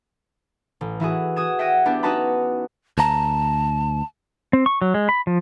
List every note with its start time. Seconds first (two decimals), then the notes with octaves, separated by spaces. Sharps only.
0.81 A1
1.00 E3 E4 F#4 G#4
1.36 F#4 D#6 G#6 E7
1.59 E5 F#5 G5 G#6 A#6 D#7
1.86 B3 D4 E4 G4
2.03 C#4 D#4 F#4 B4 A5 B5
2.98 D2 A5 A#5
4.53 C4
4.66 C#6
4.82 F#3
4.94 G#3
5.09 B5
5.27 F3